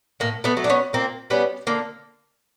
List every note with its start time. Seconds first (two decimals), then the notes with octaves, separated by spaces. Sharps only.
0.20 A2 A#3
0.44 A3 B3
0.57 F#3 A3
0.64 D4
0.70 B3 C#4
0.93 A#2 A#3 C4
1.30 G3 B3 C#4
1.67 D3 A#3